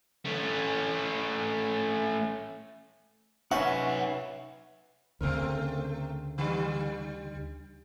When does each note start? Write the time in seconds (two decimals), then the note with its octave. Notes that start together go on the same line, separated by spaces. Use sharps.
0.25 A3 C#4
3.51 F#3 C#4 D#4 B4 E5 F#5
5.21 D2 C#3 A3 C4 A#4
6.38 D3 G3